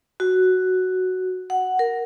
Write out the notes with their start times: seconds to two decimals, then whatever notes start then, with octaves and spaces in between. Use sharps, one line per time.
0.20 F#4
1.50 F#5
1.79 A#4